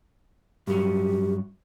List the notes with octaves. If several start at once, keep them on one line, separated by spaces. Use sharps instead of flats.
G2 F#3 G4